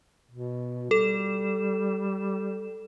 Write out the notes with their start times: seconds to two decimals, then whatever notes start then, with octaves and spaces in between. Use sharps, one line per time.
0.31 B2
0.91 G3 A4 E7